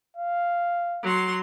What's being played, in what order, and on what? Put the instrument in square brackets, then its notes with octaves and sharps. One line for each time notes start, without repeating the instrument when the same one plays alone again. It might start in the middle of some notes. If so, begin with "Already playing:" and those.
[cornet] F5
[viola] F#3 C6